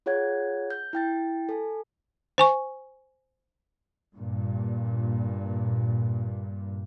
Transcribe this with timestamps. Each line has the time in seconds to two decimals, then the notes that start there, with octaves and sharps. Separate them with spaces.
0.06 F4 G#4 C#5 F#5 G#6
0.71 G6
0.93 E4 G5 A6
1.49 A4 G#5
2.38 C5 G#5 C#6
4.13 G2 A#2